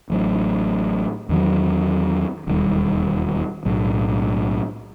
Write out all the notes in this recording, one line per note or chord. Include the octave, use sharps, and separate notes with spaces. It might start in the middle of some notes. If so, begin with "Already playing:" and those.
A1 A2 F#3
E2 D#3 F#3
E1 D#2 D#3 G3
B1 A2 F#3